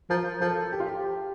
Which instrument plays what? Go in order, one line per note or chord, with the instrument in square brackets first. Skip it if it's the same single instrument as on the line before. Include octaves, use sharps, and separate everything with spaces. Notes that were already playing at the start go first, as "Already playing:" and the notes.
[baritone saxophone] F3 [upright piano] A#4
[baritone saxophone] F3 [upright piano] A4
[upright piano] G4
F4
G4